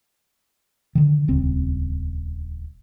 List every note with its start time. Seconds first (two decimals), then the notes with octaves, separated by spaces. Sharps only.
0.95 D3 D#3
1.28 D#1 C#2 C4